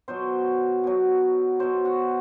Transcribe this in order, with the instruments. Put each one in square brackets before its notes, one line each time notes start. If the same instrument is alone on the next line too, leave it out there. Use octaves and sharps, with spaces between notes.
[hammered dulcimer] B2 F#3 C5
B2 F#3
B2 F#3 C5
F#4